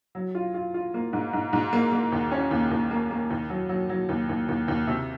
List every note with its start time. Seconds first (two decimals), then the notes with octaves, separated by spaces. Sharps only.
0.15 F#3
0.35 F4
0.54 F4
0.74 F4
0.94 A#3
1.13 G#2
1.33 G#2
1.53 G#2
1.73 A#3
1.92 A#3
2.12 D#2
2.32 C#4
2.51 D#2
2.71 D#2
2.91 A#3
3.11 A#3
3.30 D#2
3.50 F#3
3.69 F#3
3.89 F#3
4.09 D#2
4.29 D#2
4.49 D#2
4.68 D#2
4.87 C3